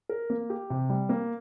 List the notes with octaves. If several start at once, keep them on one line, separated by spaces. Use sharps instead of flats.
A#4
A#3
G4
C3
G3
A#3